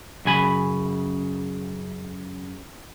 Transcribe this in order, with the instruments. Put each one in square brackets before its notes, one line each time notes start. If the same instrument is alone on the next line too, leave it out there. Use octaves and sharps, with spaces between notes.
[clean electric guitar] F#2 C#3 G#5 B5